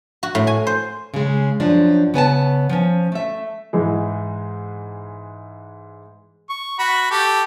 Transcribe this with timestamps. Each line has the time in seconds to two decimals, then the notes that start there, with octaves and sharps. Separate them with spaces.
0.23 F#4
0.35 A2
0.47 G#5
0.67 C5
1.14 C#3 G#3
1.60 F#2 F3 D4
2.14 C#3 B3 G#5 A5
2.69 F3 C#4
3.12 A3 E5
3.73 G#2 E3 G#3
6.50 C#6
6.79 F#4 B5 C#6
7.11 G4 A4